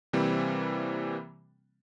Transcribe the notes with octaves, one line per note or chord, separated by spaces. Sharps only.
C3 E3 G3 A#3 C4